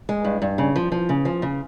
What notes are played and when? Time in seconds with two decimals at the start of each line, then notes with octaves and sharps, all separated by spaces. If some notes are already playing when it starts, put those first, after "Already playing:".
0.09 G#3
0.25 G2
0.42 G2
0.58 C#3
0.76 F3
0.92 F3
1.09 C#3
1.25 F3
1.42 C#3